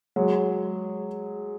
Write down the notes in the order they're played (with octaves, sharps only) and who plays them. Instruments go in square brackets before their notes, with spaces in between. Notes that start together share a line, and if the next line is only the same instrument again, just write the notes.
[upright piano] F#3 G#3